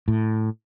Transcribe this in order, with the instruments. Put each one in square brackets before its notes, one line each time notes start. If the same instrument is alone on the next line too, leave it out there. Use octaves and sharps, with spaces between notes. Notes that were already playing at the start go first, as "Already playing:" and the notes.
[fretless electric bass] A2